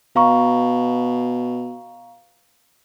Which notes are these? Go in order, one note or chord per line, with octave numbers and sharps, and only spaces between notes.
B2 F5 A#5 C#6